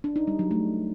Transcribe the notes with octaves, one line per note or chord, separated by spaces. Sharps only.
D4
D#4
G3
F#3
A3